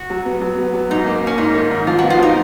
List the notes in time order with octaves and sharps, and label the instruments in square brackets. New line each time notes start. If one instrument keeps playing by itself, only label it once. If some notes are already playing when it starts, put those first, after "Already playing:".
Already playing: [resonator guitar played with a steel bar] F#4
[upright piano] F#3
B3
F#3
B3
F#3
[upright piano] G#2 [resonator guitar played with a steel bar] D#4
[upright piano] A#3
[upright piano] A#3 [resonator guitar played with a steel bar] C#4
[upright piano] G#2 [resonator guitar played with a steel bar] D#4
[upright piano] D#3
G#2
[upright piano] F3 [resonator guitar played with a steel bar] F4
[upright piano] B3 [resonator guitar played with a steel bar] F#4
[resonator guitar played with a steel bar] F4
[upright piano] F3 [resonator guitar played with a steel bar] D#4